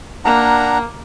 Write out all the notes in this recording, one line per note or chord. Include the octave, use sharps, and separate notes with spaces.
A#3 D4 F#5 A#5